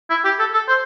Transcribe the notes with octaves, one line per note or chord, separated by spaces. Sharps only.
E4
G4
A4
A4
C5